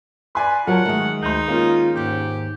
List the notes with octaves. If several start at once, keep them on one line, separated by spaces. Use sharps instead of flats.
B4 D5 G#5 C6
F#3 F4 A#4 C#5 F#5 A5
D#3 G#3 A3
D2 D#4 C6 G6
A#3 C#4 F4
D#2 G#2 G4 F#5